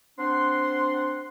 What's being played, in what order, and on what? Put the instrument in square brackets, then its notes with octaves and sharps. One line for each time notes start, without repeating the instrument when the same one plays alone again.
[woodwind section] C4 D4 F#5 C6